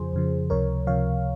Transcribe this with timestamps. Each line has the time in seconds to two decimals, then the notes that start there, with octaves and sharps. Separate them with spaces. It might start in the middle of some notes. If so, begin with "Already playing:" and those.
Already playing: F2 C#3 F3 G#4 C5
0.13 F2 C#3 F3
0.50 C#2 C3 F3 A#4 C#5
0.87 C#2 C3 F3 C#5 F5